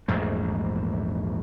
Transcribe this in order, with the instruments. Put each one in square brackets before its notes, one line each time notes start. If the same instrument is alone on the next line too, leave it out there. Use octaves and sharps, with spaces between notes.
[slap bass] A#1 E2 G#2 A3